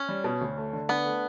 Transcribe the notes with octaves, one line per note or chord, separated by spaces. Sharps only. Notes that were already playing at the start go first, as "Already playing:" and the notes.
Already playing: C#4
G3
B2
D2
A3
D3
B3 D4
A3